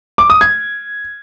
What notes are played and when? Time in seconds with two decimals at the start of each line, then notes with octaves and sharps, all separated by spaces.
0.18 D6
0.30 D#6
0.41 G#6